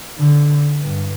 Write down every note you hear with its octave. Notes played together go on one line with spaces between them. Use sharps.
D3
G2